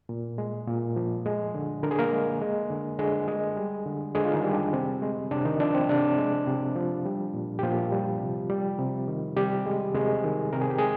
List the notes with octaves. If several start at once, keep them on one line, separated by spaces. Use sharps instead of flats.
A#2
G#3
A#2
F3
G#3
D3
D3 A#4
G#4
A#3 A#4
G#3
G#3
D3
D3 G#3 G#4
G#3
G3
D3
D3 G#3 G#4
F4
D#3 D#4
G3
D4
C3 C4
G#3
C3 D4
D#3 D#4
F3 D4
C4
C3 D4
G#3
C3
F3
G3
A#2
G4
A#2 F3 F4
G3
C3
G3
C3
D#3
C3 G3 G4
G#3
C3 G#3 G#4
D#3
C3 A#4
G#4
G4
G#3 G#4